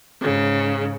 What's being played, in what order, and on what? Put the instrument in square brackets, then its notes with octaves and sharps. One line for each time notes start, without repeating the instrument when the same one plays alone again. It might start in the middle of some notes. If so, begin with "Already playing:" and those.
[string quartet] G#2 C#3